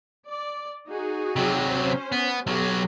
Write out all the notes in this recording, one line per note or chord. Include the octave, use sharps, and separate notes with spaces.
D5
D#4 F#4 G#4
C3 F#3
C#4 C5
B3
B1 F#3 G4